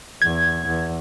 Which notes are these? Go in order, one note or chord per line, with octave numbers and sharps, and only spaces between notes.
E2 G#6
E2